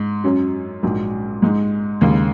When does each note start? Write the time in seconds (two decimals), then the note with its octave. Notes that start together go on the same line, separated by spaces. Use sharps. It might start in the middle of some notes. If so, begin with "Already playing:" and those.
Already playing: G#2
0.24 F#2 F#3 C#4
0.83 A#1 G#2 F#3
1.42 G#2 G#3 D#4
2.01 D#2 C#3 G#3